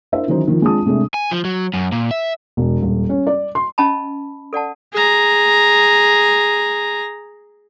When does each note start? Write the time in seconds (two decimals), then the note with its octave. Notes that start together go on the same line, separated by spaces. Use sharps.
0.12 D4 E4 A#4 C5 E5
0.28 D#3 E3 F#3 C#4 D#4 C5
0.47 D#3 F3
0.62 G#3 C4 D4 F4 A5 D#6
0.86 C3 G#3 A3 D4
1.14 G#5
1.31 F3
1.45 F#3
1.74 F#2
1.92 A#2
2.11 E5
2.57 E1
2.83 D#1
3.09 C#4
3.27 D5
3.55 C6
3.78 C#4 D#5 A5 B5
4.53 A4 D5 F#5 A5
4.94 G#4 A#5